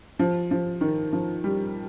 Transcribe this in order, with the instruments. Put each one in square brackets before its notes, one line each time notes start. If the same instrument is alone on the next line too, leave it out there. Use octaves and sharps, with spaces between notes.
[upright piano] F3
F3
D#3
F3
G3